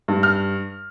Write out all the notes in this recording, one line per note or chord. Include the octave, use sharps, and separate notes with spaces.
G2
F6